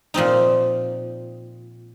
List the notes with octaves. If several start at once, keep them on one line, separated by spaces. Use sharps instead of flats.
A#2 F3 C4 D#4